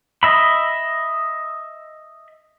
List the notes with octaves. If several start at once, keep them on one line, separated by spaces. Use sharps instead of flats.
D#5 E5 B5